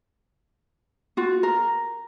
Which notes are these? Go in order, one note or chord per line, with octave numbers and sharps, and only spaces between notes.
F4 F#4
A#4